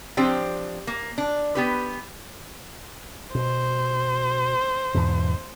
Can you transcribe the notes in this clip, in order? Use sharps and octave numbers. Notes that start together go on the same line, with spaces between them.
F3 C4 D4 G4
A#3
D4
B3 G4 B4
B2 C5
E2 G#2 B2